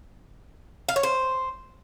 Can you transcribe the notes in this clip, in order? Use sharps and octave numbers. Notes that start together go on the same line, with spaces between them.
F5
C#5
C5